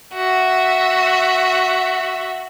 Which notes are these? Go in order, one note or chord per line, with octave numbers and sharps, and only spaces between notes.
F#4 E5